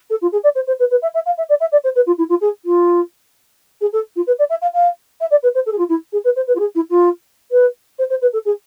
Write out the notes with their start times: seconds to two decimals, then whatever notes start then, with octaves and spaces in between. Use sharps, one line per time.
0.10 A4
0.22 F4
0.32 G#4
0.44 D5
0.55 C5
0.67 C5
0.80 B4
0.91 B4
1.02 E5
1.14 E5
1.26 F5
1.38 E5
1.49 D5
1.60 E5
1.72 D5
1.84 C5
1.96 B4
2.06 F4
2.18 E4
2.29 F4
2.41 G#4
2.65 F4
3.81 G#4
3.93 A4
4.16 F4
4.27 B4
4.39 D5
4.50 E5
4.62 F5
4.74 F5
5.20 E5
5.31 D5
5.43 B4
5.55 C5
5.66 A4
5.72 G#4
5.78 F4
5.89 E4
6.13 G#4
6.24 B4
6.36 C5
6.47 B4
6.55 F4
6.59 G#4
6.75 E4
6.90 F4
7.51 B4
7.99 C5
8.10 C5
8.22 B4
8.33 A4
8.45 G#4